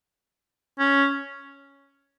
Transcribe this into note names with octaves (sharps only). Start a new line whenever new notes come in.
C#4